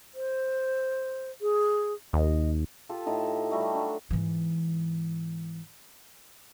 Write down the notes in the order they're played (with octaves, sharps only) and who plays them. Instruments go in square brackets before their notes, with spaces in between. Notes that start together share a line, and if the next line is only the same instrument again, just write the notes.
[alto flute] C5
G#4
[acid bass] D#2 [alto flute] D#5
[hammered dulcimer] F4 G4 A4
A2 D#4 A4
G3 A3 F#4
F#3 D4
[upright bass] G#2 E3